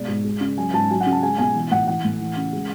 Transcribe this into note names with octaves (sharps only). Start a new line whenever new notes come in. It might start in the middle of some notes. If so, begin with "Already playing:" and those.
Already playing: B2 G#3 D5
G#2
G#3
C#3
F#3 G#5
G#2 A5
F#3 G#5
F#5
C#3
A5
G#3 G#5
B2 G#5
E3
A2 F#5
E3 F#5
A2
E3
C#3
G#3